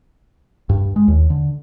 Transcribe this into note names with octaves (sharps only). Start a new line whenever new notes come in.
G2
G#3
D#2
D3